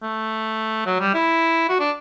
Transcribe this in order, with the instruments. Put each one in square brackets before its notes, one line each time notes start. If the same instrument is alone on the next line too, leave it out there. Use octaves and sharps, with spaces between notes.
[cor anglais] A3
F#3
G3
E4
F#4
D4